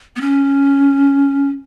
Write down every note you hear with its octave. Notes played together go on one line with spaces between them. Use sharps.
B3
C#4